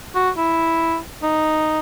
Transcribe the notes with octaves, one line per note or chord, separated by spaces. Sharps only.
F#4
E4
D#4